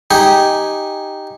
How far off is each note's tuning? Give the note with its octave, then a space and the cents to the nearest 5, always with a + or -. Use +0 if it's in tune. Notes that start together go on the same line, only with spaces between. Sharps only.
D#4 +0 G4 -5 G#5 -10